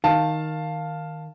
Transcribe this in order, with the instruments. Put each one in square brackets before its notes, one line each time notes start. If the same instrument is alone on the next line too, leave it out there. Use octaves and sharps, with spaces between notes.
[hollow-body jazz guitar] D#3 [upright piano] F5 A5